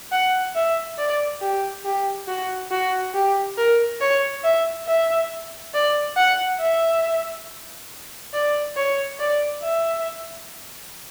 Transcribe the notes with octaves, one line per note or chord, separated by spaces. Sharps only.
F#5
E5
D5
G4
G4
F#4
F#4
G4
A#4
C#5
E5
E5
D5
F#5
E5
D5
C#5
D5
E5